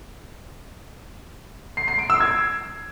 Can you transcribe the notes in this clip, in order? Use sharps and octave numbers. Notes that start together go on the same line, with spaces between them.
C7
C7
D7
E6
G#6